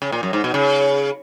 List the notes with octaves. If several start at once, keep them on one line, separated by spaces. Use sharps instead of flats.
C#3
A#2
F#2
G#2
B2
C#3